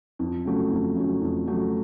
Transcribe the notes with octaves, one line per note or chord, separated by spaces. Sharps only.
F2
C#3 F#3 A3
F2
C#3 F#3 A3
F2
C#3 F#3 A3